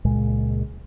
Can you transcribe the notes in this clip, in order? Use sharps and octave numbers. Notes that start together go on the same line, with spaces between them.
C#2 A#2 G#3